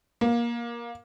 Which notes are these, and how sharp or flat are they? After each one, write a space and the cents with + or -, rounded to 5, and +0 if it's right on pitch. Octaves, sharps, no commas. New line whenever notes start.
A#3 +20